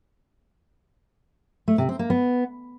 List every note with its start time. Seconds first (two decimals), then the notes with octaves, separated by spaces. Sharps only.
1.68 A3
1.78 C3
1.89 C4
1.99 A#3
2.10 B3